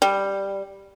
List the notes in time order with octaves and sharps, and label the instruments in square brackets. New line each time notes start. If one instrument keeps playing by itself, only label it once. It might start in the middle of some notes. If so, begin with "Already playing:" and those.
[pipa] G3